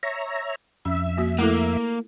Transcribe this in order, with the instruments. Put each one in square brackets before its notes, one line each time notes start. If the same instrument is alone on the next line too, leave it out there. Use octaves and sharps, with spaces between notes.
[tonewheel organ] C#5 E5 A#5
[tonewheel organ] F2 E5 [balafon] C#4
[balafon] A#3 F#4
[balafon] A3 E4 A4 [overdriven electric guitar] A#3